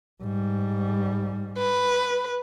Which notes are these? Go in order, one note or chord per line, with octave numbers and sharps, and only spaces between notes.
G#2 G3
B4